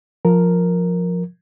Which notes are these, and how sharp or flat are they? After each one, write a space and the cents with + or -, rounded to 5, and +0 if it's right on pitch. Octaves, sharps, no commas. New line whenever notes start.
F3 +10 A#4 +0